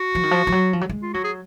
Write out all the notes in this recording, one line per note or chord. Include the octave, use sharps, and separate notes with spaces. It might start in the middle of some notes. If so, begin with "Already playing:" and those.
Already playing: F#4
F3
D#3
F3
F3
F#3
F3
F#3
G#3
F4
F#3 F#4
G#4